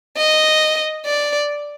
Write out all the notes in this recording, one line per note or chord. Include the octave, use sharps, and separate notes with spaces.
D#5
D5